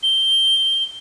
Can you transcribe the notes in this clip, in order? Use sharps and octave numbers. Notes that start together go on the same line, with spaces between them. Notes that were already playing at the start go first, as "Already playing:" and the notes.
G7